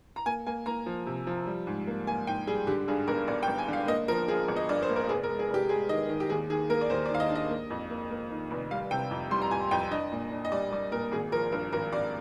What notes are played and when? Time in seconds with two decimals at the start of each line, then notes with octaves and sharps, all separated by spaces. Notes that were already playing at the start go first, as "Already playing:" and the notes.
0.16 A#5
0.26 A#3 G#5
0.46 A#3 G#5
0.66 A#3 A#5
0.86 F3
1.06 C3
1.27 F3
1.47 G3
1.67 G#2
1.87 A#3
2.07 A#3 G#5
2.27 G#2 G5
2.47 G3 G#4
2.67 D3 G4
2.88 G2 G#4
3.07 G1 A#4
3.28 G1 D5
3.43 G5
3.48 G1
3.58 G#5
3.68 D3 F5
3.88 A#3 D#5
4.08 F3 A#4
4.28 F3 G#4
4.48 G1
4.56 D#5
4.69 G2 D5
4.82 C5
4.89 A#3
4.96 A#4
5.09 F1 G#4
5.23 A#4
5.29 G#3
5.39 G#4
5.49 F1 G4
5.69 G#3 G#4
5.89 D#3 D#5
6.09 D#3
6.20 G4
6.29 D#2 G#4
6.50 D#3 G#4
6.69 A#3 A#4
6.81 D5
6.90 D#2 C5
7.05 D5
7.10 D#3 F5
7.20 D#5
7.30 D4
7.35 D#5
7.50 A#3
7.70 F2
7.90 A#3
8.11 A#3
8.31 D#3
8.51 F1
8.71 G3 F5
8.91 C3 G5
9.11 F2
9.31 G3 C6
9.42 A#5
9.51 F2 G#5
9.71 F2 G5
9.91 D4 D#5
10.12 A#2
10.32 D4
10.45 D#5
10.52 G3 D5
10.72 G3 D5
10.92 A#2 A#4
11.12 G#1 G#4
11.32 F3 A#4
11.52 G2 A#4
11.72 G#1 A#4
11.92 G#1 D5